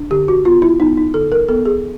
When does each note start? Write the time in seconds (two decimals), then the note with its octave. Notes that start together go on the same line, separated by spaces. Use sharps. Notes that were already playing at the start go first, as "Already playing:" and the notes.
Already playing: D4
0.11 D3 G4
0.28 F#4
0.45 B3 F4
0.62 E4
0.80 B3 D#4
0.97 D#4
1.14 D3 A4
1.32 A#4
1.49 B3 A4
1.65 G#4